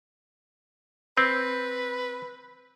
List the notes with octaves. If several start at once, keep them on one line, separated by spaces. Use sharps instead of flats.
C4 B4